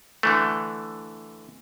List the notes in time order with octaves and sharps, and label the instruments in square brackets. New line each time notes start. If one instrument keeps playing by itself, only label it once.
[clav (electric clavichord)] D3 E3 A3